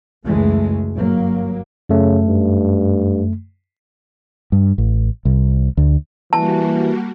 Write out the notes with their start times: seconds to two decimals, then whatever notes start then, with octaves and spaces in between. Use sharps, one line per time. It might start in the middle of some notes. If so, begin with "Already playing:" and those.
0.25 C#2 F#2 E3 G#3 A3
0.96 G1 F#3 A#3
1.89 F#2 C#3 A3
2.27 G2
4.52 G2
4.78 A1
5.25 C2
5.77 D2
6.33 E3 G3 A#3 F#4 A5